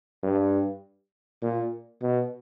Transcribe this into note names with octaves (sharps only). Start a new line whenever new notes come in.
G2
A#2
B2